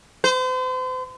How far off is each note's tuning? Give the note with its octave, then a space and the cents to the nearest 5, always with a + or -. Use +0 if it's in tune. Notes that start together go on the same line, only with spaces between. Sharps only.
C5 -40